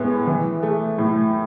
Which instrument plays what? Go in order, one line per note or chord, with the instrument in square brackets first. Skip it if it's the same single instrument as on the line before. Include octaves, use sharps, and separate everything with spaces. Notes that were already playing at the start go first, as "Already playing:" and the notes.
Already playing: [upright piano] A2 G#3 B3
E3
A3
A2